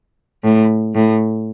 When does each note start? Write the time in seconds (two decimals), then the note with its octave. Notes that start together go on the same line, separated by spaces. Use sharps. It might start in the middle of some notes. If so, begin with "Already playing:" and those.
0.44 A2
0.94 A2